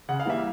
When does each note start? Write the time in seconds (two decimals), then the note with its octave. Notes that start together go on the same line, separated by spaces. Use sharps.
0.09 C#3 F#5
0.20 F5
0.25 E3 G3 A#3 E5